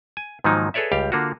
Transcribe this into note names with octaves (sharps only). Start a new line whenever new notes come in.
G#5
G#2 D#3 F3 F#3 A#3 D#4
G#4 A4 B4 C#5 D5 E5
C#2 G3 G4 F5
D3 A#3 F4 F#4